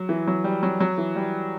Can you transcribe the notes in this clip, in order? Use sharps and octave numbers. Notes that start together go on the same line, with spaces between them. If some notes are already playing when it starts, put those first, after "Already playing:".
Already playing: F#3
E3
F#3
G3
F#3
F#3
E3
G3